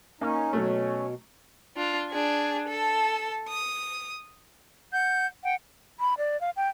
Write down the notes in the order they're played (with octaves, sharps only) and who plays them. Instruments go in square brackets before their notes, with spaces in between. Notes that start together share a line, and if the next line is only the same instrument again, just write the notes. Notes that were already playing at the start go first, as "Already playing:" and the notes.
[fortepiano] A#3 [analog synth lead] C#4 [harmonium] D#4
[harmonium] B2 [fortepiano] F#3 A3
[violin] D4 F4
D4 G#4
A4 A5
D#6
[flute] F#5 [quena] G6
[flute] F#5 [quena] G5
[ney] B5
D5
F5
G5